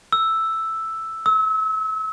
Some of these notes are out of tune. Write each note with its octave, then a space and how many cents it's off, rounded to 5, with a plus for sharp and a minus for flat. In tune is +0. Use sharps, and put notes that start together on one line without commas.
E6 +0
E6 -35